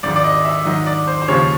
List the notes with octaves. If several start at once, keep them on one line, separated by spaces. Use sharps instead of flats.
G#1 G#2 D#3 D5
D5
D#5
E5
G#2 D#3 F#3 D#5
D5
C5
C5
D#2 C#3 F3 C#5